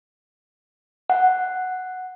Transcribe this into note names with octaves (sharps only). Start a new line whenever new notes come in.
F#5